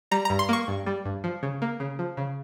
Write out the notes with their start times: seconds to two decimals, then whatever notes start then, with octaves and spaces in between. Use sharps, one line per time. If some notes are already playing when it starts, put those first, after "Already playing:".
0.11 G3 A#5
0.25 G2 A#5
0.39 C6
0.49 A#3 C#6
0.68 G2
0.86 G3
1.05 G2
1.24 F3
1.43 C#3
1.62 A#3
1.80 C#3
1.99 F3
2.17 C#3